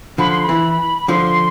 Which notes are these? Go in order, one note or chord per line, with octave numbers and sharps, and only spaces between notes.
D3 F3 B5
C6
B5
E3
D3 F3 C6